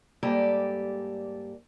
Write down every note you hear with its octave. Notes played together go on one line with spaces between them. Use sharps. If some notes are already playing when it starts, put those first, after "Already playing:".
G#2 G3 A#3 G4 A4 D5